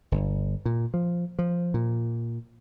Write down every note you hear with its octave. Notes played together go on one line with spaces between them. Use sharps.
G1
A#2
F3
F3
A#2